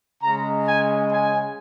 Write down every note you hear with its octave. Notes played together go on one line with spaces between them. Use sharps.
C#3 G#3 A#5
G#5
G#5